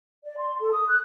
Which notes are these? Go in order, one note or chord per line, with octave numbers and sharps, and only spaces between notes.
D5
C6
A4
D#6
F#6